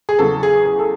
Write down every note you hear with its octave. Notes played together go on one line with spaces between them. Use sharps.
G#4
E2 C#3 F#3 A4
G#4
G#4
A4